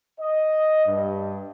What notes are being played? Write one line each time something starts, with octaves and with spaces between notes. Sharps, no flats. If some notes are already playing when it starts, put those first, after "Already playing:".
D#5
G2